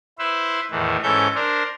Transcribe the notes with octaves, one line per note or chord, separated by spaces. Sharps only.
E4 B4 C5 E5
E2 A2 D#3 E3
G#2 E3 C#4 A4 E5 G6
D4 A#4 C5